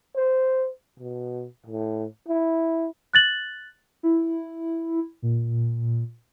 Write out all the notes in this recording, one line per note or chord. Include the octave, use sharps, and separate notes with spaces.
C5
B2
A2
E4
F#6 A6 F#7
E4
A#2